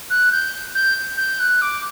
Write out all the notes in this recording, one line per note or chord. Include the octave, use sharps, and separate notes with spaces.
F#6
G6
G6
G6
F#6
D6